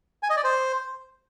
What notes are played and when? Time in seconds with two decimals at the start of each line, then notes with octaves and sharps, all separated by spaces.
0.23 G#5
0.30 D#5
0.37 D5
0.44 C5